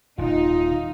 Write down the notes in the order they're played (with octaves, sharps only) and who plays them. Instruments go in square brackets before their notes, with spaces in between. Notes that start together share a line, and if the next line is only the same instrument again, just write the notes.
[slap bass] D#1 [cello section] D#4 [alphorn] F4